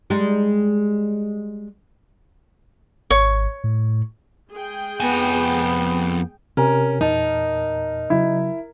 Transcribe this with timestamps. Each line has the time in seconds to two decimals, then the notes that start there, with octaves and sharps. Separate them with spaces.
0.10 G3 G#3 D#4
3.11 G#1 C#5 C#6
3.64 A2
4.52 G#3 G#4 G5
5.00 F2 B3 G#5
6.57 C3 C#4 G4 A#4 G#5
7.01 E2 A#2 D#4 A5
8.10 C#3 F#3 E4